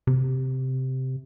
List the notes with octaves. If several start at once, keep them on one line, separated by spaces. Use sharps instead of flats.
C3